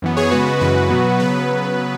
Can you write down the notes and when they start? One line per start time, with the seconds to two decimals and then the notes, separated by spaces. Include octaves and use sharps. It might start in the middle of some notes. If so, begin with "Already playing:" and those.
0.02 F#2 E3 B3
0.17 G#4 C#5
0.31 C#3 G#3 B3 F#4 B4
0.46 F#4
0.60 F#2 C#3 E3 G#3 F#4 B4
0.90 B2 F#3 B3
1.19 C#3 F#3 B3 B4